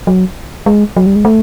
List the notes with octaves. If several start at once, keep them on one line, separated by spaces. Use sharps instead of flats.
F#3
G#3
F#3
G3
G#3
A3